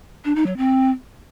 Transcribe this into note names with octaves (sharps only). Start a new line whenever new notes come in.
D4
D#4
F#3
C4